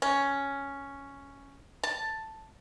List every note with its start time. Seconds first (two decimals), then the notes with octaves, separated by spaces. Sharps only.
0.02 C#4
1.83 A5